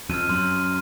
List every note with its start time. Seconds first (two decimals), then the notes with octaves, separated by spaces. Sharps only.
0.10 F2 F6 D#7
0.29 F#2 C6